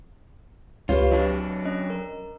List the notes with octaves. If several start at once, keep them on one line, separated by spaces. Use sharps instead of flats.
C#2 F4 G4 B4 C#5
F#3 D4 D#5
C#4 D#5
A#4